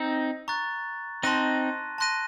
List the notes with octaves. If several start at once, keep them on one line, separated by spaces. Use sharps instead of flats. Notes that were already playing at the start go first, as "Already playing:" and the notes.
Already playing: C4 D#4
A#5 C#6 F#6 A6
C4 D#4 A5 C6 F#6 A#6 D#7
A5 C6 F#6 A#6 D#7